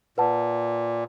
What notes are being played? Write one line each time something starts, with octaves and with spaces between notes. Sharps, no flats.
A#2 B4 F#5 A5